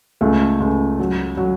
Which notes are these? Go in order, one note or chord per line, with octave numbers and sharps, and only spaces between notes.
C#2 A3
C#2
F#3
F#3